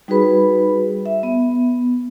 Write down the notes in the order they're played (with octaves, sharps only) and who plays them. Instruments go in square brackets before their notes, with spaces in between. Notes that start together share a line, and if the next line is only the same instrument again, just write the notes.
[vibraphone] G3 D#4 F#4 G#4 B4 B5
E5
B3